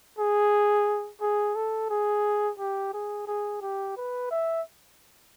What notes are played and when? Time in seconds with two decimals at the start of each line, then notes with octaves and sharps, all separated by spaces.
0.18 G#4
1.21 G#4
1.56 A4
1.90 G#4
2.59 G4
2.94 G#4
3.27 G#4
3.62 G4
3.97 B4
4.31 E5